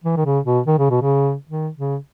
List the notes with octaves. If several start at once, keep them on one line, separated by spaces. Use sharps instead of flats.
E3
D#3
C#3
B2
D#3
C#3
B2
C#3
D#3
C#3